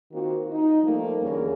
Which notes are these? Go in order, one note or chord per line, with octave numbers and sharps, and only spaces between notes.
D#3 A#3 C4 F4 F#4
D#4
F3 G3 A3 A#3
D#2 D3 E3 C#4 G#4 A#4